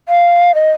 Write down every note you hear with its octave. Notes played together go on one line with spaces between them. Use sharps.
F5
D#5